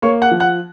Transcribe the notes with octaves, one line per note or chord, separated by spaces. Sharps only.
A#3 C#5 C#6
F#5 F#6
F3
F#5 F#6